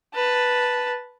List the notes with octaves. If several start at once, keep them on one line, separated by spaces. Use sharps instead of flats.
B4 A5